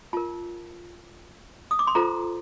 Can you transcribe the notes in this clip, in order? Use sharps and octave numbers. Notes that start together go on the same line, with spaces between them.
F4 A#4 A5
D#6
D6
C6
F4 A4 C5 A#5